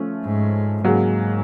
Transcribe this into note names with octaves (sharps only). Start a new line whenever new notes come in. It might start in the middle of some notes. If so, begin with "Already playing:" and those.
Already playing: F3 A3 C#4
G#2
G#2 C#3 F#3 A#3